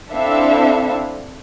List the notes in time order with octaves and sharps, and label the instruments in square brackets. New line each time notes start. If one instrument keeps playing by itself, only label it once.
[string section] C4 D4 E4 A4 E5 F5